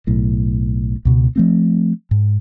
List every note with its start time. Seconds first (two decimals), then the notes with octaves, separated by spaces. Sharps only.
0.07 B1 A2
1.05 C#2 B2
1.36 F3 A3 C4
2.11 G#2